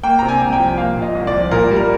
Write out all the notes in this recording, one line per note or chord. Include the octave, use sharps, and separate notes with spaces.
A#3 G5
C3 A#5
G#5
C2
G5
F3
A#3 F5
A#2
D#5
C2
D5
F3
A#2 A#4
G3
A#4